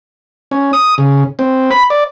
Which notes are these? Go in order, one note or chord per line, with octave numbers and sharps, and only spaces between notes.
C#4
D#6
C#3
C4
B5
D5